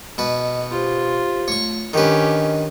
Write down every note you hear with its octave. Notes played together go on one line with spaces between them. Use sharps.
B2 B4 D#5
F4 G4 C5
A3 C#5 C#6
D#3 C#4 D4 G4 B4 D#5